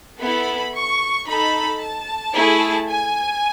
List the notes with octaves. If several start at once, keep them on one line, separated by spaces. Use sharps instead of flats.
B3 E4 A4 B5
C#6
D#4 A4 B5
A5
A3 E4 G#4
G#5